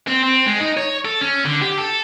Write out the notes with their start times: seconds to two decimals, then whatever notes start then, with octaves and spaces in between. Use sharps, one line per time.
0.07 C4
0.23 C4
0.46 G#3
0.60 D#4
0.77 C#5
1.05 A4
1.21 C#4
1.45 D3
1.62 G4
1.78 A4